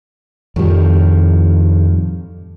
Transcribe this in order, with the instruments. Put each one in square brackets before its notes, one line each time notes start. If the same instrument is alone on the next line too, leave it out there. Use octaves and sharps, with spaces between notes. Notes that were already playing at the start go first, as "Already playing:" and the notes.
[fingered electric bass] F2 G3 [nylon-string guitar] A2 D#3 F3